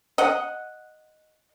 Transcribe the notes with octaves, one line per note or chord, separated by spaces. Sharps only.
D#5 F#5